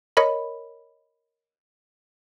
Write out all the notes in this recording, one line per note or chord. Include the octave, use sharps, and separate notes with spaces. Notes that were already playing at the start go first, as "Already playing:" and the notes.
A#4 C#5 D#5 B5